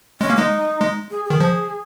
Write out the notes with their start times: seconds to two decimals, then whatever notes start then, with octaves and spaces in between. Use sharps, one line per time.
0.20 G#3 C#4
0.30 A#3
0.36 G#3 D#4
0.80 G#3
1.11 G#4
1.25 G#4
1.30 D#3
1.40 F3